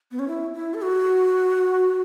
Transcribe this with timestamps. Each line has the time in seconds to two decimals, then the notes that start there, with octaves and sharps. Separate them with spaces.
0.12 B3
0.19 C#4
0.28 E4
0.54 E4
0.74 A4
0.82 F#4